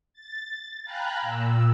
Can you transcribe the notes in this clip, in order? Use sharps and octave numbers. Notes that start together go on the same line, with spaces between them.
A6
F5 G5 G#5 A#5 B5 F#6
A#2 E6